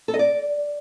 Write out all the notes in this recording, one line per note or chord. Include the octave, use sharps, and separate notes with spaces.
A4
D#5
D5